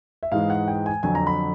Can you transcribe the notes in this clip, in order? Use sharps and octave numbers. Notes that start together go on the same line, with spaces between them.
E5
G#2 E3 G#3 F5
F#5
G5
G#5
F2 D3 F#3 G#5
A#5
B5